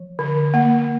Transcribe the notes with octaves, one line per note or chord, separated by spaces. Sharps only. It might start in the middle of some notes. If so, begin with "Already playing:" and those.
Already playing: F3
D3
A#3